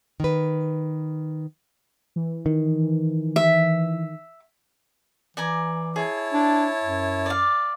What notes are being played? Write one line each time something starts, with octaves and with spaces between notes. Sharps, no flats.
D#3 B4
E3
D#3
E5
E3 D5 G#5 A#5
E4 G#4 C#5 A5
D4
F#2
D5 F5